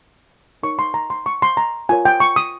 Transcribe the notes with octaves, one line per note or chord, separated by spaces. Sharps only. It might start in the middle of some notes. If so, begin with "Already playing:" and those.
D#4 A#4 C#5 C#6
C6
A#5
C6
C#6
C6
A#5
F4 A#4 C#5 G#5
G5
C#6
D#6